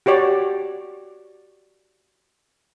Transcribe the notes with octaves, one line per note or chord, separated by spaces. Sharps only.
F#4 G4 C#5 D5